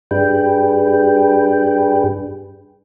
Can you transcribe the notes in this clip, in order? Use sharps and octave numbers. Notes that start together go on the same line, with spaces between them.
G2 D4 G4 G#4 B4 G5